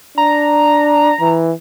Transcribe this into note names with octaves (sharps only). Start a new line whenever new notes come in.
D4 A#5
E3